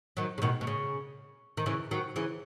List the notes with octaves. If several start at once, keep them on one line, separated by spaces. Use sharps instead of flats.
D#3 F#3
C#3
B2 D#3
B2
C#3
D#3
C#3 E3
D#3 F#3
C#3 E3